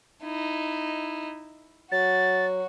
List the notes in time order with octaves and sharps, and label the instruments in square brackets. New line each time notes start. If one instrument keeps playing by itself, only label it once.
[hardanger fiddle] D#4 E4
[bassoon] F#3 [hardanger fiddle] F#4 [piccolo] A6